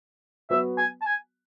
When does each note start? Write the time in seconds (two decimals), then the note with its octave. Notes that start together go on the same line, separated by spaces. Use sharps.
0.50 F#3 B3 F#4 B4 E5
0.78 G#5
1.02 A5
1.06 G#5